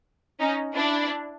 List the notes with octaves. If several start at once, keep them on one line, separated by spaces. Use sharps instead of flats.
C#4 D#4
D4 E4